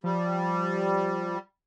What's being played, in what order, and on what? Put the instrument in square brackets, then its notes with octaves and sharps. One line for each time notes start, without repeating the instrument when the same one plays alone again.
[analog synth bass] F3 [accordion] G3